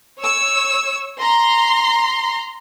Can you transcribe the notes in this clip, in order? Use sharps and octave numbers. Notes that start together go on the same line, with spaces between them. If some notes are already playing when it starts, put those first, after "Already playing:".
C#5 E6
A#5 C6